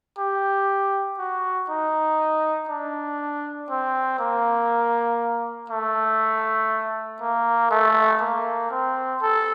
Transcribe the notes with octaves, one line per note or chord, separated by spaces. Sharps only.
G4
F#4
D#4
D4
C4
A#3
A3
A#3
A3
A#3
C4
A4